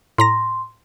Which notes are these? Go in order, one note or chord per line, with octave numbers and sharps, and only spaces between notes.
A2 A#5 C6 A#6